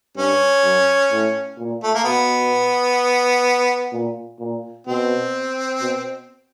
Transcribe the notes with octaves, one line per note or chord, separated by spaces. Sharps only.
G2 C#4
F#2
A2
A#2
A3
A#3
B2 B3
A#2
A#2
B2 C4
B2